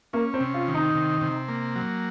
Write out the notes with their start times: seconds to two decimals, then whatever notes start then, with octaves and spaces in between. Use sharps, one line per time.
0.13 A#3 C#4
0.34 C4
0.41 C3
0.54 F4
0.68 D#3
0.75 D#4
0.95 C3
1.21 C3
1.48 A#3
1.75 F#3